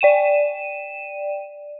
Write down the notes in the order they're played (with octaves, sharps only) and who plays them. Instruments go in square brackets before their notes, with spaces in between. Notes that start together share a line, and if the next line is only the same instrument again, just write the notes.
[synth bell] D5 G5 D#7 E7